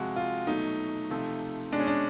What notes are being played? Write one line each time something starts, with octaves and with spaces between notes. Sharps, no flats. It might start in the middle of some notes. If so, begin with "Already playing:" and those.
Already playing: C3 F3 G#3 F#4
F4
B2 F#3 A3 D#4
C3 F3 A3
B2 G#3 D4
C#4
D4